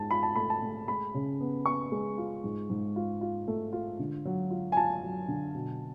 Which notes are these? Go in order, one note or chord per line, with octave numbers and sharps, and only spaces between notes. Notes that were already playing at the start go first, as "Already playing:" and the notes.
Already playing: G#2 F4 A5
F4 B5
A5
A3 B5
A5
A3
G#3 B5
C#3
B3
B3 C#6
G#3
F4
G#2
G#2
F4
F4
A3
F4
D3
F#3
F4
G#5
F4 A5
F#3
D3
B2